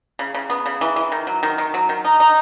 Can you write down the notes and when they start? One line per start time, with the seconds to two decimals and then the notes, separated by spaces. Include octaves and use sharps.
0.19 C#3
0.34 C#3
0.50 B3
0.66 C#3
0.81 E3
0.96 E3
1.12 D#3
1.27 F#3
1.43 D#3
1.58 D#3
1.74 F#3
1.89 D#3
2.05 D#4
2.20 D#4